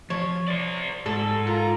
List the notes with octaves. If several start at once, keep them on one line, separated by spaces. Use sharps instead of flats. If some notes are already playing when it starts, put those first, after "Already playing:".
F3 C#5
C5 D5
G#2 A4
F4 A#4 A#5